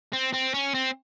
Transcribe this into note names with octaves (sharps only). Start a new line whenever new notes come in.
C4
C4
C#4
C4